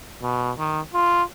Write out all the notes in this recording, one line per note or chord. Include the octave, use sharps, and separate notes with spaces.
B2
D#3
F4